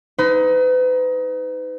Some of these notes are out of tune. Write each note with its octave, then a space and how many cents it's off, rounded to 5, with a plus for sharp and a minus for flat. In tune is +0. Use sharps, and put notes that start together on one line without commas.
D#4 +20 B4 +40